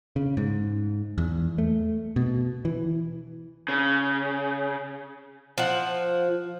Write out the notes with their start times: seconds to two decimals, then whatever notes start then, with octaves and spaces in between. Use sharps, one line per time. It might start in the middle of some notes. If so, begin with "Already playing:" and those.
0.16 C#3
0.37 G#2
1.18 E2
1.58 A3
2.16 B2
2.65 E3
3.68 C#3
5.58 F3 F#5